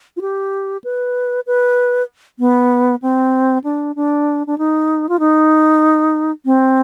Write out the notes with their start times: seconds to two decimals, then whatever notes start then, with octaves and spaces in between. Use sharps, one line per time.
0.17 F4
0.21 G4
0.84 B4
1.47 B4
2.39 B3
3.02 C4
3.64 D4
3.96 D4
4.47 D4
4.58 D#4
5.09 F4
5.19 D#4
6.45 C4